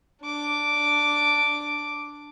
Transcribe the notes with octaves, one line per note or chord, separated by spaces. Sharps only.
D4 D6